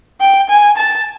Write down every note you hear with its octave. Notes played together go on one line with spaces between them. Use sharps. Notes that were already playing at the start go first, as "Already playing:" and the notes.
G5
G#5
A5